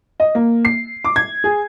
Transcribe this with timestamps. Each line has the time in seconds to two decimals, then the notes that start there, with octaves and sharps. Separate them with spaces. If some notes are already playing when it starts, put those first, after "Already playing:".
0.20 D#5
0.35 A#3
0.65 C7
1.05 D6
1.16 G#6
1.44 G#4